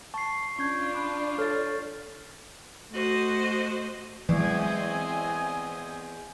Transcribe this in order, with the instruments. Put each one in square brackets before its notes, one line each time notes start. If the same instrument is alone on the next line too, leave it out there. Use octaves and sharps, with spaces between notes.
[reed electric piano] A5 [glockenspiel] C#6 C7
[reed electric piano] C#4 G#6 [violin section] D4 F4 [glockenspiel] C#6 G6
[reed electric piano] B5 D6 F#6
[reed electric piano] A4 C#5 [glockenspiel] F6 A6
[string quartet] A3 F#4 C5 D#5
[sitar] E2 [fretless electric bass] E3 F#3 G#3 [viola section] C4 D#5 G#5